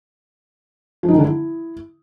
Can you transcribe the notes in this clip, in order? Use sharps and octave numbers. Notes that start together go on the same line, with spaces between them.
F3
D#4
D#3
D3
E4